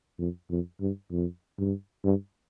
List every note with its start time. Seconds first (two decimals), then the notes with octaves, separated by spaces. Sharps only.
0.19 F2
0.50 F2
0.81 G2
1.11 F2
1.58 G2
2.04 G2